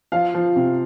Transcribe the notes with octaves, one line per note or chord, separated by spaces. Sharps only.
F3 F5
F3
C3